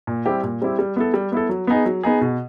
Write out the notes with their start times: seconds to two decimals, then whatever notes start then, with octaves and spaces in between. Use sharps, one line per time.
0.07 A#2
0.25 G3 C4 E4 G4
0.44 A#2
0.62 G3 C4 E4 G4
0.79 G3
0.96 B3 E4 A4
1.14 G3
1.32 B3 E4 A4
1.49 F#3
1.67 B3 D#4 G#4
1.86 F#3
2.03 B3 D#4 G#4
2.21 B2